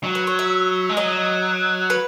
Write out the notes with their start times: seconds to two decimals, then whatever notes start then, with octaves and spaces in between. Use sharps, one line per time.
0.03 F#3
0.15 B4
0.27 C#5
0.39 E5
0.89 G#3
0.97 F#3 D#5
1.90 B4